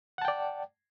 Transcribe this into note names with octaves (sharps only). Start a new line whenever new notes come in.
D5 F#5 G5 A5